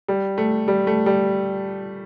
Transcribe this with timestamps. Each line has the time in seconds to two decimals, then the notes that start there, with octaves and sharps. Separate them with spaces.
0.08 G3
0.38 A3
0.68 G3
0.87 A3
1.06 G3